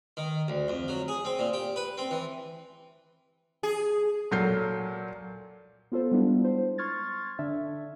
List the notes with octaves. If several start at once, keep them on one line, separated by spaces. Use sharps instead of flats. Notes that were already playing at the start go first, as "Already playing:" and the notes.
D#3
D2
F2
F#3
G#4
C4
A#2
G4
B4
C4
E3
G#4
A#2 F#3 A4 F6 G6 C7
B3 F4 A4 C5
G3 G#3 B3 D4 E4 F4
C5
C6 C#6 F6 G#6 A6
D3 D4 E5